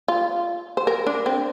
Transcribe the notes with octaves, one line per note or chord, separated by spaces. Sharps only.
F4
C5
A#4
D4
C4